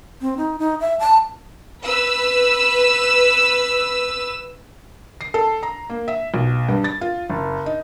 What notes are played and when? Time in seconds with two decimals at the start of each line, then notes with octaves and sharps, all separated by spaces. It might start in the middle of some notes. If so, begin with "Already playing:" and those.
0.21 C4
0.37 D#4
0.59 D#4
0.81 E5
1.00 A5
1.84 B4 E6
5.21 C7
5.34 A4
5.63 A#5
5.90 A#3
6.08 E5
6.34 B1
6.69 G2
6.84 A6
7.01 F4
7.30 F#1
7.66 D#4